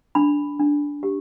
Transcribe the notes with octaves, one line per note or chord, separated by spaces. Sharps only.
D4 B5
D4
G4